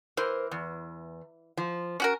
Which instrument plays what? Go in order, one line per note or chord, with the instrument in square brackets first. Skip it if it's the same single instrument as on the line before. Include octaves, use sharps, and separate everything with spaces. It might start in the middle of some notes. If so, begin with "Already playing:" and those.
[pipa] E3 [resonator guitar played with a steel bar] A#4 C5
[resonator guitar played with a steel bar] E2
F3
[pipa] C#4 F#4 A#4